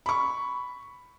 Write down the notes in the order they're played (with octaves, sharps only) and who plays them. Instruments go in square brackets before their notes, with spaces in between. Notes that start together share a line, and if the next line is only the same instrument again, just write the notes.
[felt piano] B5 C#6